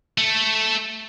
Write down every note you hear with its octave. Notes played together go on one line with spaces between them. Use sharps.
A3